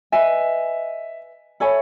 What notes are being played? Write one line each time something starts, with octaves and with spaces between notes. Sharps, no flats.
B4 D#5 E5 G#5
A4 C#5 E5 G#5 B5